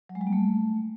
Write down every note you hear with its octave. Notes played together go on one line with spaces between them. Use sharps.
F#3
G#3
G3
A#3
A3